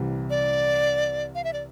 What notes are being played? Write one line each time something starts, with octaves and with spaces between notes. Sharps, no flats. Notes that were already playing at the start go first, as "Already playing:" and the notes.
Already playing: C2 C3 E3 G3
D5
F5
E5
D5